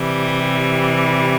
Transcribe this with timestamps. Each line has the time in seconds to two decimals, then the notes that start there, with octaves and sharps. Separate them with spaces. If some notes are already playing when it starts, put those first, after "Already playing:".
Already playing: C3 E3 G3